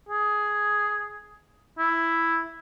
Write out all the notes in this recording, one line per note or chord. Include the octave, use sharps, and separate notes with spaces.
G#4
E4